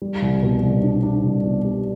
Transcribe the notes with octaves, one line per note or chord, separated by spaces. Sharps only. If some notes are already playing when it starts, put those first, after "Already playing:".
G3
C2
B2
C2
D4
D4
C2
B2
G3